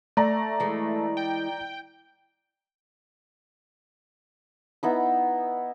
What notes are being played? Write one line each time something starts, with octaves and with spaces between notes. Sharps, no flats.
A3 D5 A#5
E3 G#3
G5
B3 D#4 E4